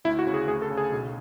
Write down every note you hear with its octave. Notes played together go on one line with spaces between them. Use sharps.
D2 E4
F#4
C#3
G#4
D2 G#4
A4
C#3
G#4
B1